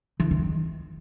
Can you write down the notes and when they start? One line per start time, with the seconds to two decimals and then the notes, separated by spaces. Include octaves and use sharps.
0.20 E3
0.31 D#3